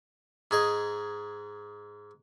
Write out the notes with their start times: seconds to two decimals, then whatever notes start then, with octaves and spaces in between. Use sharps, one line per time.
0.51 G#2 G#4 D#5